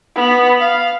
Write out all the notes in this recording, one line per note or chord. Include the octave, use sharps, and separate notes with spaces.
B3
F5